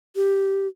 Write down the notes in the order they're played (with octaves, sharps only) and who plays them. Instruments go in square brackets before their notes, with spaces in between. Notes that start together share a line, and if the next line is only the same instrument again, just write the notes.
[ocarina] G4